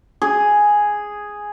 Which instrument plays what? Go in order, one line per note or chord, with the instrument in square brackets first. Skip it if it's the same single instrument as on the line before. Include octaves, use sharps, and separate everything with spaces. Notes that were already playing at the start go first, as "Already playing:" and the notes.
[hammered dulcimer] G#4